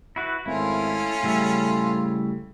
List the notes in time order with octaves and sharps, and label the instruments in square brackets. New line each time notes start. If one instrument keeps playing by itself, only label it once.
[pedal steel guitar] E4 F#4 B4
[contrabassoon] G#1 [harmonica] A3 C#4 F4 [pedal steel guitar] E4
[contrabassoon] A2 [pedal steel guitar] C#3 G3 E5